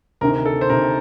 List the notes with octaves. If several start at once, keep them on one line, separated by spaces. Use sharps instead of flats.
D2 C3 D#3 A#4
A4
C5
D2 C3 D#3 A#4